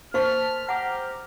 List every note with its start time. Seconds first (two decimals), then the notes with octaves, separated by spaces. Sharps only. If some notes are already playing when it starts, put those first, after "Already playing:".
0.14 A#3 C5 F5 A5 C#6 F6 B6
0.69 G4 F#5 A#5 D6 F6